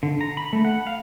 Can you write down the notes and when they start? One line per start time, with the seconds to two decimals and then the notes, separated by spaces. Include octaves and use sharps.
0.03 D3
0.21 A#5
0.37 B5
0.53 A3
0.65 F#5
0.87 F5